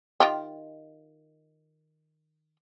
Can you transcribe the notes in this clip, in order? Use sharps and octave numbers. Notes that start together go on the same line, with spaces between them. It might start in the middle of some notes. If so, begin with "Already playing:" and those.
D#3 F4 G4